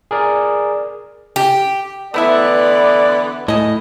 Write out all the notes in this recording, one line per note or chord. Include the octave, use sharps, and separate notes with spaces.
G#4 A#4 D5
G4
D3 E3 A3 B3 E4 D5 E5
A2 G#4 D#5